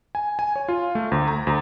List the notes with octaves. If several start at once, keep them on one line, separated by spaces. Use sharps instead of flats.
G#5
G#5
C#5
F4
A3
D2
A#5
D2